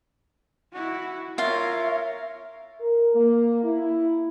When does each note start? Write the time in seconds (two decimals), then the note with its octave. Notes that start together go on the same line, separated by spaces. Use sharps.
0.73 E4 F#4
1.38 F4 A#4 C#5 E5 F5
2.80 A#4
3.14 A#3
3.63 E4